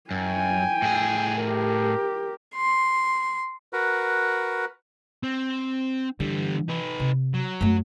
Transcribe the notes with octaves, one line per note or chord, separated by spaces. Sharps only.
F#2 G5 G#5
A2 G#4
G4 A#4
C6
F#4 A#4 B4
C4
D3 E3 G3
D#4 B4
C3
F#3
F#2 A3